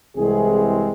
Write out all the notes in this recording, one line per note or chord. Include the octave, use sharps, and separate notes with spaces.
C2 C3 E3 G#3 C4 G#4